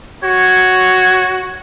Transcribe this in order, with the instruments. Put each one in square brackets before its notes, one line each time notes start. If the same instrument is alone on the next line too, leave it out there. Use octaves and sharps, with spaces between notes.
[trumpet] F#4 [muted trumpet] C#5